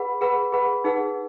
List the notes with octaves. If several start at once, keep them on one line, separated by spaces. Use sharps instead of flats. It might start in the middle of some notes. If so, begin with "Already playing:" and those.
Already playing: G#4 B4 F#5 B5
G#4 B4 F#5 B5
G#4 B4 F#5 B5
D#4 G#4 B4 F#5